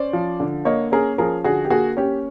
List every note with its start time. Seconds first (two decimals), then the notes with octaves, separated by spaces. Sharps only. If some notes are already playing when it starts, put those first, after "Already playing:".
Already playing: C#4 C5 D5
0.13 F3
0.40 D3
0.65 A#3 C#5 D#5
0.92 C#4 G#4 A#4
1.18 F3 G#4 A#4
1.44 D3 F#4 G#4
1.65 G4
1.70 A#3 F#4 G#4
1.97 C#4 G4